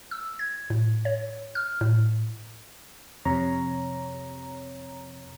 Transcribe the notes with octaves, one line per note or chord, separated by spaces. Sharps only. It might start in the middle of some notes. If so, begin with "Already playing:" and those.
E6
G#6
A2
C#5
F6
A2
F2 C3 C#5 A#5